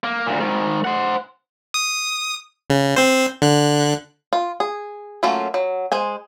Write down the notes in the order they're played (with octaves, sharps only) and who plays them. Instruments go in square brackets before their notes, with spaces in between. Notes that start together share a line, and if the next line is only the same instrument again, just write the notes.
[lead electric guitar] A#3
D2 A#2
G#2 D#3
C5 F#5
[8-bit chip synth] D#6
C#3
C4 C5
D3 F#6
[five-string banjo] F4
G#4
F#3 A3 A#3 C#4 F4
F#3
G#3 C5 G#5